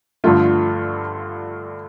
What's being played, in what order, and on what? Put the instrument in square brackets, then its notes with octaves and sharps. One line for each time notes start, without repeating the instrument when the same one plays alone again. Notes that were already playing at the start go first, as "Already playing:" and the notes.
[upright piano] G2 D3 F3 A3 F4